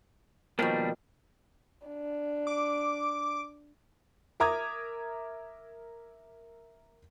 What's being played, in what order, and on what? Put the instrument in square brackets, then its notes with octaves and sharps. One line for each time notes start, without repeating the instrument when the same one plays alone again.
[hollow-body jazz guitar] B2 F3 A#3 [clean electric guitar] D#3 G3 D4
[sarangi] D4
[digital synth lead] D6
[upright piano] A#4 E5 A#5 D6 D#6 G#6